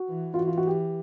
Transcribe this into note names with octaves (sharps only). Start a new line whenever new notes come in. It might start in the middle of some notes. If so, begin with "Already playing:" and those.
Already playing: F#4
E3
F4
E3 F#4
F4
F#4
G4